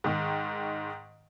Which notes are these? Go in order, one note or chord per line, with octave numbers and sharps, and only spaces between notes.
G#2 D#3